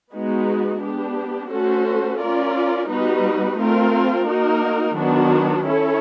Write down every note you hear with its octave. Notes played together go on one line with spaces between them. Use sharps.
G#3 B3 D#4 F#4
B3 D4 G4
A3 C#4 F#4 A4 C5
C#4 F4 A#4 D5
G3 B3 D#4 F#4 B4
A3 C4 F4 A#4
A#3 D#4 F#4 A#4
D#3 F#3 B3 D4 F#4
C#4 E4 A4 C#5